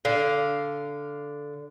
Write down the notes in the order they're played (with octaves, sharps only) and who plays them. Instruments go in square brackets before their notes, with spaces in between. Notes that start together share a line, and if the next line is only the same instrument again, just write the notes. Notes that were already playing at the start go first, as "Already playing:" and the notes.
[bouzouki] D3 F5